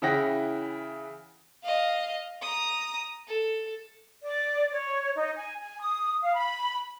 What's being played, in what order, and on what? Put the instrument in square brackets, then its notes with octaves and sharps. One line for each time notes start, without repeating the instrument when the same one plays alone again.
[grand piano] C#3 E3 E4 F#5 G5 A#6
[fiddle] D#5 F5
A#5 D#6
A4
[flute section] D5
C#5
D#4
G#5
G#5
D#6
F5
B5